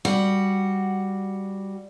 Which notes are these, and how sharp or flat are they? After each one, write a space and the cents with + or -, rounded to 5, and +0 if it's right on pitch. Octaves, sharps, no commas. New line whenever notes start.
G3 +0 F#4 +0